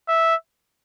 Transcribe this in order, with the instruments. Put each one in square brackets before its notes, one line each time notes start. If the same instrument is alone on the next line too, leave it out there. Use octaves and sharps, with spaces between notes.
[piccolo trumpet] E5